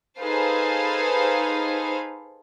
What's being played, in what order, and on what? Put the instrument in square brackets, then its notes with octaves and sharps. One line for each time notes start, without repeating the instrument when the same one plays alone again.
[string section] D#4 G#4 A4 B4 C5 F5